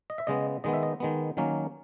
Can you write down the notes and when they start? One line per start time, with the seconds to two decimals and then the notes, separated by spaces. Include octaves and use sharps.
0.10 D#5
0.18 E5
0.27 C#3 G#3 B3 D#5
0.64 D#3 G#3 B3 D#5
0.73 E5
0.83 D#5
1.00 D#3 G#3 B3
1.37 D#3 F#3 A#3 C#4